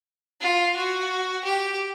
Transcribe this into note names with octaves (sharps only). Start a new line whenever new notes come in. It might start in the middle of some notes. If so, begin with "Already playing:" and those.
F4
F#4
G4